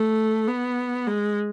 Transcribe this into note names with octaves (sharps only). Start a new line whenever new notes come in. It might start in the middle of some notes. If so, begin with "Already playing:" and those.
Already playing: A3
B3
G#3